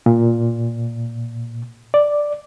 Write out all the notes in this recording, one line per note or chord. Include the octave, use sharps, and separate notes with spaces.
A#2
D5